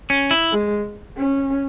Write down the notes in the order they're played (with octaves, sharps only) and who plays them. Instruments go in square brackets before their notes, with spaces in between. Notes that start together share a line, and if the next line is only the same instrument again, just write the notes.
[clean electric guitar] C#4
E4
[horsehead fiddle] G#3
C#4